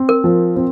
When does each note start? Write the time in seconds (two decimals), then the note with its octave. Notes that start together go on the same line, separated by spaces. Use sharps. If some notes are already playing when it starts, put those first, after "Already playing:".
Already playing: C4
0.09 A#4
0.24 F3
0.56 C4